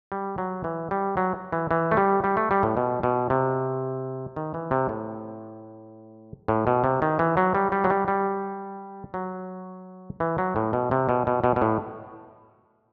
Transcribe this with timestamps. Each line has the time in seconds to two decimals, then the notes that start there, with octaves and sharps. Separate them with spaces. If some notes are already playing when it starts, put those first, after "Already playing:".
0.12 G3
0.38 F#3
0.64 E3
0.91 G3
1.17 F#3
1.52 E3
1.71 E3
1.91 A3
1.97 G3
2.24 G3
2.37 A3
2.51 G3
2.63 A2
2.77 B2
3.03 B2
3.30 C3
4.36 D#3
4.54 E3
4.71 C3
4.89 A2
6.48 A2
6.67 B2
6.84 C3
7.02 D#3
7.19 E3
7.37 F#3
7.55 G3
7.72 G3
7.84 F#3
7.90 G3
8.08 G3
9.14 F#3
10.20 E3
10.38 F#3
10.56 A2
10.73 B2
10.91 C3
11.09 B2
11.27 B2
11.44 B2
11.56 B2
11.62 A2